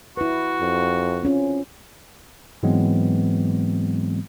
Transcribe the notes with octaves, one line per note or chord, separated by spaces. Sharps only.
E4 F#4 B4
F2
C4 C#4 F4
G#2 E3 F#3 G#3 B3 C4